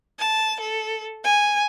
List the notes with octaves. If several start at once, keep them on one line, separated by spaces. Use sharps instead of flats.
A5
A4
G#5